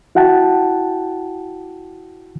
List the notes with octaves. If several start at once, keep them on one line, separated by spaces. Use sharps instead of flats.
E4 F#4 F#5 G5 A5